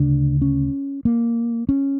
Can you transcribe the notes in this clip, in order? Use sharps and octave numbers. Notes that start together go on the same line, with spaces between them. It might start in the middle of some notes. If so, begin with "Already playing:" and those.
Already playing: D2 C#3 D4
C#4
A#3
C#4